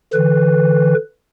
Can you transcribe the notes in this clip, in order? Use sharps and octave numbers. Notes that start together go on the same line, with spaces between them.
D3 E3 B4